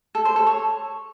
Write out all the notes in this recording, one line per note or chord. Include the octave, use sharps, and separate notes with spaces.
A4
C5
A4
C#5